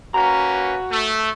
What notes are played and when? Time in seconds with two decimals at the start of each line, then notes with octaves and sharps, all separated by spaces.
0.14 A#3 C#4 F#4 B4 A#5
0.91 A3